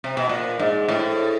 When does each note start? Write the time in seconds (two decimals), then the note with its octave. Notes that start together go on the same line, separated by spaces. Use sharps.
0.04 C3
0.17 B2
0.29 A#2
0.59 G#2
0.88 A2